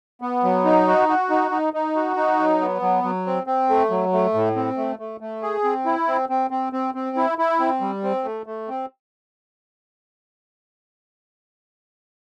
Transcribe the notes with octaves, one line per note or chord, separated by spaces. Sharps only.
B3
F#3
D#4
F#4
F#4
D#4
D#4
D#4
F#4
D#4
F#3
B3
F#3
F#3
C4
C4
A3
F#3
A3
A2
C4
A3
A3
A3
G#4
C4
E4
C4
C4
C4
C4
C4
E4
E4
C4
G3
C4
A3
A3
C4